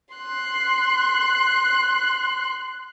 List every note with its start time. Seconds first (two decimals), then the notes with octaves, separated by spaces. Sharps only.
0.15 C6 F#6